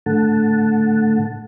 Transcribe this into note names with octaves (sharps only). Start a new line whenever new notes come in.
A2 D3 A3 F#5 A5